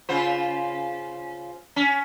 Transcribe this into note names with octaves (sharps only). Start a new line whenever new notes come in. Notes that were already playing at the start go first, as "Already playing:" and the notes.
C#3 F4 C5
C#4